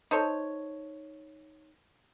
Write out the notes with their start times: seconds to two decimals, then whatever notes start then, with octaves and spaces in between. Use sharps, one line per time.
0.11 D#4 A4 C5 C#5